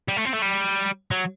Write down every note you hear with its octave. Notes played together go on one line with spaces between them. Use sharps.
G3
A3
C4
A3
G3
F#3